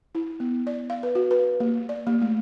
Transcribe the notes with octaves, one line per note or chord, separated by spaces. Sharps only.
E4
B3
D5
F5
B4
F#4
B4
A#3
D5
A#3
A3